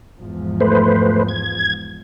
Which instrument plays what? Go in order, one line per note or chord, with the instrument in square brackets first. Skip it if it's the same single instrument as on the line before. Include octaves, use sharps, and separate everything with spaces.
[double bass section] E2 G#2 F3
[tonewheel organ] A3 B4 C5
G#6